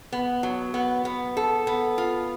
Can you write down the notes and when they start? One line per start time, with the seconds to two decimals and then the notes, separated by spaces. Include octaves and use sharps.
0.12 B3
0.43 F#3
0.74 B3
1.05 B3
1.37 A4
1.67 B3
1.98 F4